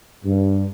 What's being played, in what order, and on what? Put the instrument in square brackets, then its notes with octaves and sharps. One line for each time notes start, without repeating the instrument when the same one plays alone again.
[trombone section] G2